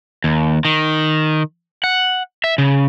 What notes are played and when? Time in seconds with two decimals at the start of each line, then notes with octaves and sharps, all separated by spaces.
0.24 D#2
0.65 D#3
1.84 F#5
2.44 E5
2.58 C#3